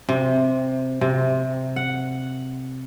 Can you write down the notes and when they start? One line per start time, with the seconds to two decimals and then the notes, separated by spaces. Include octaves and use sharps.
0.09 C3
1.01 C3
1.76 F#5